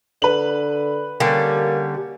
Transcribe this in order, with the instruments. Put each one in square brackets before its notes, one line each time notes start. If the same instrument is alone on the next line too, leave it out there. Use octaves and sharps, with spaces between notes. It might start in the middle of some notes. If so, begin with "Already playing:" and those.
[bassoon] D3 [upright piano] B4 F#7
[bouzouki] D3 G3 C#4 [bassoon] A#3